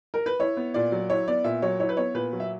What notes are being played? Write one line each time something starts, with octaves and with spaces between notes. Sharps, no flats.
A#4
B4
E4 C#5
B3
A#2 D5
F#3
E4 C#5
B3 D5
A#2 E5
F#3 C#5
E4 C#5
B4
B3 C#5
A#2 B4
F#3
E5